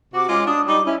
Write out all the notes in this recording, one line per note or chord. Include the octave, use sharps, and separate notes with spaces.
C3 F#4 D6
G#3 C#4 F4
D4 D#6
G3 D#4 D6
C#4 E4